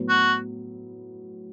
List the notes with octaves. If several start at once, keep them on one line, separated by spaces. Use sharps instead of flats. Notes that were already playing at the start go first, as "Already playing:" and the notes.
Already playing: A2 F#3 B3
F#4